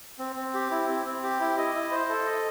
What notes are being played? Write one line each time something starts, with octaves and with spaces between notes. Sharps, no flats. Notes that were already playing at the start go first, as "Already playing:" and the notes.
C4
C4
G4
E4
C4
C4
G4
E4
D#5
E4
C5
A4
D#5